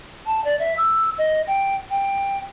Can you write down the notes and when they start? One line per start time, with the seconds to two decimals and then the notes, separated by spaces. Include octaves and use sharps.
0.26 A5
0.44 D5
0.59 E5
0.77 E6
1.17 D#5
1.47 G5
1.90 G5